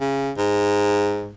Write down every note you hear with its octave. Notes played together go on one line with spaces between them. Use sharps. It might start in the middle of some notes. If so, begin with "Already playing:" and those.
C#3
G#2